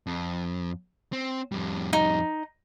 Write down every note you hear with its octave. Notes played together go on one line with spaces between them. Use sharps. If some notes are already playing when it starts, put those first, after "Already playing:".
F2
C4
F2 G3
D#4